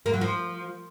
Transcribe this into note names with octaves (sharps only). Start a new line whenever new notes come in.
A#3
F#3
F3